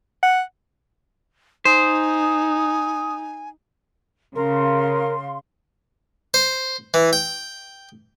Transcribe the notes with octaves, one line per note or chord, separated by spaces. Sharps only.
F#5
D#4 C5 G#5 D#6
C#3 A#4 F5 C6
C5
E3
G5